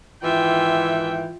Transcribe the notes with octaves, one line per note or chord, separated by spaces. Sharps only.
G#2 D#3 E3 F4 E5 G5